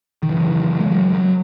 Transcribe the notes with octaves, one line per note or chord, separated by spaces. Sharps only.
D#3
F#2 C#3 E3
G#3
F#3
F#3